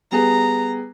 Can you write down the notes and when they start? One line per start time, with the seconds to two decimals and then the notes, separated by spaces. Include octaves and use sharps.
0.12 G3 B3 G#4 A#5